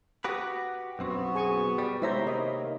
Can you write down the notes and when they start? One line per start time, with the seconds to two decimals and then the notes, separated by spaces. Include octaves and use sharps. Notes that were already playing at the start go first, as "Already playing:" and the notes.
0.24 F#4 G4 B4 D#6
0.99 B1 F#2 B3 C4 F#4
1.35 G#4 G#5 C#6
1.78 G3
2.02 C3 D#3 G#3 E4 C5 C#5 E5 A#5
2.27 A#3 D#5